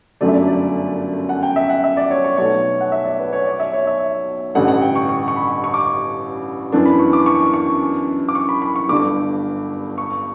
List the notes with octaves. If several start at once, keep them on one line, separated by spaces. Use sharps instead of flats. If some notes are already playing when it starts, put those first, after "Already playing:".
G1 F#2 D3 F#3 A3 D5
E5
D5
D5
F#5
G5
E5
F#5
E5
D5
C#5
C#5
B1 B2 A3 C#5
F#5
E5
D5
B4
C#5
D5
E5
C#5
E5
A1 G2 D3 F#5
F#5
G5
C#6
C#6
C#6
B5
C#6
D6
C#6
F#2 E3 B3 D4
B5
C#6
D6
C#6
C#6
D6
C#6
B5
B5
C#6
G1 G2 D3 D6
C#6